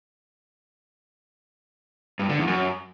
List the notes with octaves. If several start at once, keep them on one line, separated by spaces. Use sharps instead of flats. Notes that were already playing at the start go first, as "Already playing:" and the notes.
G2
D3
E2
F#2